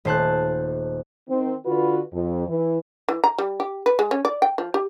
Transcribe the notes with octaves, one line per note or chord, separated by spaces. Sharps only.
D#1 A3 C5 A5 F#6 G6
D#3 C4
D3 F4 F#4 B4
F2
E3
E3
A#5
G3
G4
B4
G#3
C#4
D5
G5
F3
G4